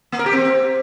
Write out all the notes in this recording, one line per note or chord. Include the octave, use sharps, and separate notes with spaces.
A#3
A#4
G4
C4